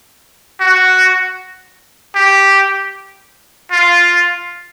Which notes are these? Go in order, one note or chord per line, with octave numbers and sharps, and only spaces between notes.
F#4
G4
F4